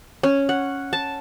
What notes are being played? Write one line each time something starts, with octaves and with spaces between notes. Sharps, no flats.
C#4
F#5
A5